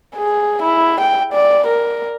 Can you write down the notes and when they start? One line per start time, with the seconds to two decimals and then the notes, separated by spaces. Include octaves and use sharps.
0.16 G#4
0.63 E4
1.01 G5
1.33 D5
1.67 A#4